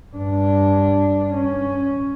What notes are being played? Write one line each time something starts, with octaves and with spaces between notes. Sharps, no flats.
G2 D4
C#4